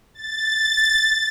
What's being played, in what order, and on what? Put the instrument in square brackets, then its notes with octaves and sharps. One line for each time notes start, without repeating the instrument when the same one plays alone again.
[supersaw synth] A6